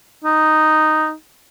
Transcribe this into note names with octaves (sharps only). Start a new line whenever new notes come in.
D#4